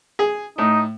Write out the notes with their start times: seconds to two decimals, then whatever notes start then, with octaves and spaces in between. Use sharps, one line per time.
0.19 G#4
0.58 A2 D#4